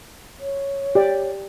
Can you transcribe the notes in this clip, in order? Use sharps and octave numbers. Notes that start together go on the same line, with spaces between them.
C#5
G4 D5 G5